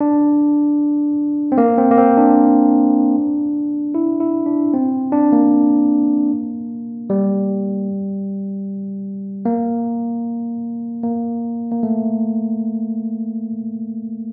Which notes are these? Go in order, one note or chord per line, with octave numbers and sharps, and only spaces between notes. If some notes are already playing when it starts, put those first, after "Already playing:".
D4
C4
A#3
C4
A#3
C4
D4
E4
E4
D4
C4
D4
A#3
G3
A#3
A#3
A#3
A3